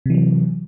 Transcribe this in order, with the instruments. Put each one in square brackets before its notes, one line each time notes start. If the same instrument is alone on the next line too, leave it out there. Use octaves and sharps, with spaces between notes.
[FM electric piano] C3
E3
F#3